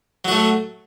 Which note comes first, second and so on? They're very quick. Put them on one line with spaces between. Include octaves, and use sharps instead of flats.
F#3 F#4 A3